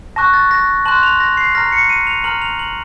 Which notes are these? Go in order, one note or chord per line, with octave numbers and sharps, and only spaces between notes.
A5 C#6 F#6 A#6
A6
A#6
A5 C6 F#6 F#7
F7
A#6
C7
A#5 F6 A#6
C#7
D#7
F7
A#5 F6 F#7
F7
F#7